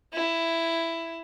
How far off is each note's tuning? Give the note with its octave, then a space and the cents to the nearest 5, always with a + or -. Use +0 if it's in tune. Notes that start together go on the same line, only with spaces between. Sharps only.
E4 +10